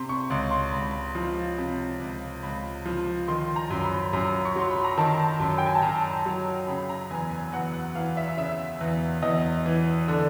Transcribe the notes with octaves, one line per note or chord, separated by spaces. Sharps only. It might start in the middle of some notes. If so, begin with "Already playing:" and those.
Already playing: C3 C6
C#6
C#2 C6
C6
C#2 B5
F3
C3
C#2
C#2 B5
F3
D#3 C6
A#5
F#2
B5
F#2 A#5
C#6
F#3 C6
B5
A#5
D#3 A5
F#2
G5
G#5
A5
F#2 A#5
F#3
C#3 B5
A#5
E2 G#5
G#5
E2 F#5
F#5
E3 F5
E5
C#3 E5
E2
E2 D#5
E3
D3